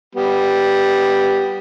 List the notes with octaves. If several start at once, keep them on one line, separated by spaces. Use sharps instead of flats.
G3 B3